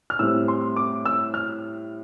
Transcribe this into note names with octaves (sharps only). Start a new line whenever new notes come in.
F6
A2 G3 C4 E6
C6
D6
E6
F6